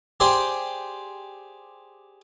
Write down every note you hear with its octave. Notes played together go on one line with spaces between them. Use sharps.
G4 G#4 C5 D5